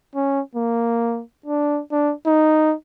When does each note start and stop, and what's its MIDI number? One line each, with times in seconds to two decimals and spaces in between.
0.15 0.41 61
0.55 1.22 58
1.46 1.81 62
1.92 2.14 62
2.26 2.74 63